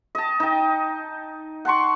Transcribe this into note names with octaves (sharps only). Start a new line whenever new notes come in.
D#5 A5
D#4 G5
F#5 A5 C6 C#6